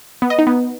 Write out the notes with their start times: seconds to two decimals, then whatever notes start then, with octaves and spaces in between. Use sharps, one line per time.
0.22 B3
0.30 D#5
0.39 D#4
0.47 B3